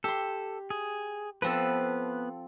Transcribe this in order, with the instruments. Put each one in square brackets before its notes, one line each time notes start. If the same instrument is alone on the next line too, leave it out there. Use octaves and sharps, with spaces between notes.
[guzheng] G4 C6 [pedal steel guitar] A4
[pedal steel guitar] G#4
[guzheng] F3 C4 A4 [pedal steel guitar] B3 B4